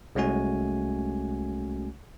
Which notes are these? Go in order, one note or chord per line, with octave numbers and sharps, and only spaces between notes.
C2 G#3 A3 C#4 F#4 G#5